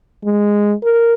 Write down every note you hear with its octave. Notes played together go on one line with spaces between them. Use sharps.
G#3
A#4